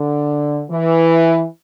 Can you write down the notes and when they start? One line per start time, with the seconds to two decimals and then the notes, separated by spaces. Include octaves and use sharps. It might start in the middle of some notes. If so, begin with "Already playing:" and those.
Already playing: D3
0.70 E3